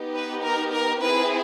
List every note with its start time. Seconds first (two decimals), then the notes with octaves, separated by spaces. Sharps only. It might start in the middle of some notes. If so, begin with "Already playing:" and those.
Already playing: B3 D#4 G4
0.15 B4
0.43 A#4
0.72 A#4
1.01 C4 E4 G#4 B4